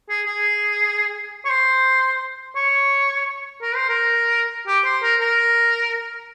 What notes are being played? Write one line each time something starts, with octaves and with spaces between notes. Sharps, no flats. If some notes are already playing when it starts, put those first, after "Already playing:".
G#4
G#4
C#5
C5
C#5
A#4
C5
A#4
G4
C5
A#4
A#4